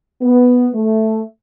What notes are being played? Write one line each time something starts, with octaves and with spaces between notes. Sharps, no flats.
B3
A3